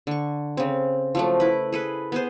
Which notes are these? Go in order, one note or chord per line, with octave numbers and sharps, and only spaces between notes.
D3 C#6
C#3 C4
F3 F#3 A3
E4 B4
G#4 A4 B4
B3 G#4 C5